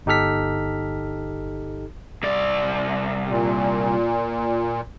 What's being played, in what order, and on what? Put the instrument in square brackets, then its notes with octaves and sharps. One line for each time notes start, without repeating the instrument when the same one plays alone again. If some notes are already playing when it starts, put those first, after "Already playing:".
[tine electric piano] G1 D#4 G4 A4 F6 B6
[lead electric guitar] C2 D5
[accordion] A#2